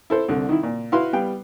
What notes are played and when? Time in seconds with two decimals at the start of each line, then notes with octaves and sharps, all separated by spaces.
0.10 E4 A4 C5
0.28 C2 D3
0.49 D#3 E4
0.63 A#2
0.92 E4 F#4 B4 F5 C6
1.13 G3 B3 F5 G5